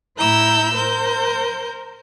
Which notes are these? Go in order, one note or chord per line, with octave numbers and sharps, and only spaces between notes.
A2 E4 A#5 E6 G6
A#4 C5 G6